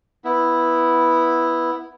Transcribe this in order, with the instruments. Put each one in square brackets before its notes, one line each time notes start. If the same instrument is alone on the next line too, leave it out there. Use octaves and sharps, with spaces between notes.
[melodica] B3 E4